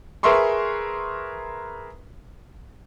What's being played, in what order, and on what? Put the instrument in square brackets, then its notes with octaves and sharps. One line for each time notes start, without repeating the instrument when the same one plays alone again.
[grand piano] G#4 A#4 B4 E5 C6 C#6